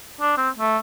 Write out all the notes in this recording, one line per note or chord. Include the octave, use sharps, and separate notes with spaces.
D4
C4
A3